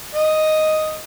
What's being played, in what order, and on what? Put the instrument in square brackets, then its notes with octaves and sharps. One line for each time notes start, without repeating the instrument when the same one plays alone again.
[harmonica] D#5